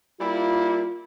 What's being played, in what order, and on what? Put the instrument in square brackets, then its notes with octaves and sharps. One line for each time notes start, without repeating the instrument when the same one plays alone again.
[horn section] G3 A#3 E4 [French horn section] F4